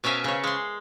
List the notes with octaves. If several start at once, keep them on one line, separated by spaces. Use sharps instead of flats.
B2 C#4 A#4 E5 F5 G#5
C#3 C#5
G#3 C6